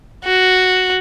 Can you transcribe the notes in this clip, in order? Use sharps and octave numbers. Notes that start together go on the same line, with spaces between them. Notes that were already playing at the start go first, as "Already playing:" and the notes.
F#4